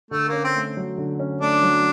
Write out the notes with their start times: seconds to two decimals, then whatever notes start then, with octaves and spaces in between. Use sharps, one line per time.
0.11 D3 A3
0.28 A#3 C#4
0.44 C4
0.55 A3
0.77 F#3
0.98 D3
1.20 C#4
1.41 A3 D4
1.63 F#3